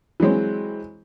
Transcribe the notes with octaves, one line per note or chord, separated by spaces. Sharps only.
E3 F#3 G#3 C4